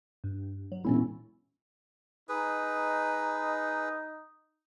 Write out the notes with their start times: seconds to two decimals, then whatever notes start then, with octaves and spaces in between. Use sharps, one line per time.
0.24 G2
0.72 F#3
0.85 E1 A#2 C#4 E4
2.29 D#4 G#4 B4